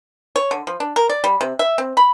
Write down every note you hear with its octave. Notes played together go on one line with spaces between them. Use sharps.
C#5
D3
F3
D4
A#4
D5
G3
C3
E5
C4
B5